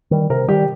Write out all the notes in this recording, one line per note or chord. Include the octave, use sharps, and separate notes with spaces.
D#3 G3
C3 A#4
D#3 G3 G4